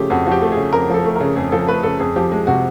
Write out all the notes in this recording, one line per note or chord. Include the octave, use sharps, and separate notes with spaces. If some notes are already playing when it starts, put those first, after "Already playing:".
Already playing: C#3 F3 A3 G4
F2 F#4
F3 F#4
G4
A3
G#4
C#3
F2 A#4
F3 A4
A3
C#3 A#4
F2 G#4
F3 A4
A3 B4
C#3 A4
F2 G#4
F3 G4
G#3
C3 F#4